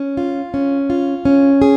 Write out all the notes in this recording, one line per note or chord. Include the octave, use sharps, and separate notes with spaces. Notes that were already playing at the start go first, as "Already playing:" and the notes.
Already playing: C#4
F4
C#4
F4
C#4
G#4